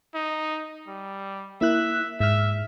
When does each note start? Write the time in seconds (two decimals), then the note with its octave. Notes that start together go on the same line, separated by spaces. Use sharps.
0.14 D#4
0.88 G3
1.61 A#3 E4 E5 F#6
2.20 G#2 E5 F6